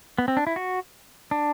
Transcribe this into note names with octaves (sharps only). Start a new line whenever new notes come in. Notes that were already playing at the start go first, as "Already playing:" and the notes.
B3
C4
D4
E4
F#4
D4